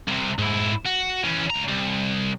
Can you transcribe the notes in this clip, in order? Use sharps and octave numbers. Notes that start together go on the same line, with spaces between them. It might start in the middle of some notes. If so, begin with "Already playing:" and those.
C2 C3
G#2 E4
F#4
E3 C#4
C#2 A#5
C2